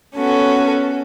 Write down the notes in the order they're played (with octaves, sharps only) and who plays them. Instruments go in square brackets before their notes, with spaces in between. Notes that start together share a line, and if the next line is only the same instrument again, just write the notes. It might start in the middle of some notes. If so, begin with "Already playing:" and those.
[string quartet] B3 C#4 F#4 A4